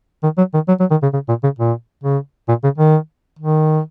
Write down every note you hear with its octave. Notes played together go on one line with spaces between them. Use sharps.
D#3
F#3
D#3
F#3
F#3
D#3
C#3
C#3
A#2
C#3
A#2
C#3
A#2
C#3
D#3
D#3